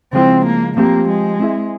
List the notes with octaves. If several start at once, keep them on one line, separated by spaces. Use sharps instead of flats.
C#3 F3 G#3 C4 E4
A#3
F3 A#3 C4 G4
G#3
C4 E4 G#4 E5